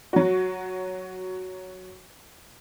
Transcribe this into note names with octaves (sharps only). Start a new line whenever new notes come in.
F#3 F#4